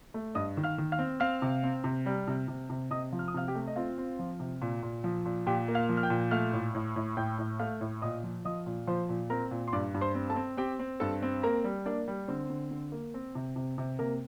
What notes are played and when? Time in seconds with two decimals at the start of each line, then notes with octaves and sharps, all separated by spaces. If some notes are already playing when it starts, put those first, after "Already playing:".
0.14 A3
0.35 G2 D#5 D#6
0.57 D#3
0.64 F5 F6
0.78 D#3
0.92 F5 F6
0.99 C4
1.20 C4 F5 F6
1.42 C3
1.63 C4
1.84 C3
2.06 G3
2.28 C3
2.48 C3
2.70 C3
2.91 C3 D#5 D#6
3.12 F3
3.19 F6
3.28 D#6
3.34 C3 F5 F6
3.48 G4 G5
3.55 A3
3.67 D#5
3.76 C4 F4 F5
3.98 C4
4.19 F3
4.40 C3
4.62 A#2
4.83 A#2
5.04 F3
5.26 A#2
5.47 A#2 G4 G5
5.68 A#3
5.75 F5 F6
5.89 F3
5.97 F6
6.03 G5 G6
6.10 A#2
6.31 A3 F5 F6
6.53 A2
6.75 A2
6.96 A2
7.17 A2 G5 G6
7.39 A2
7.59 A3 F5 F6
7.81 A2
8.02 A#2 D#5 D#6
8.24 F3
8.45 F3 D#5 D#6
8.66 A#2
8.87 F3 C5 C6
9.09 A#2
9.30 C4 A#4 A#5
9.51 A#2
9.68 C6
9.73 G2 D5 D6
9.94 G2
10.01 C5 C6
10.15 C4
10.30 A4 A5
10.36 C4
10.57 C4 G4 G5
10.79 C4
11.00 G2 A4 A5
11.22 C4
11.43 A#3 A#4 A#5
11.64 G3
11.86 A#3 D4 D5
12.08 G3
12.28 D3 C4 C5
12.50 D3
12.71 D3
12.92 A#3
13.14 C4
13.35 C3
13.56 C3
13.78 C3
13.99 C3 A#3 A#4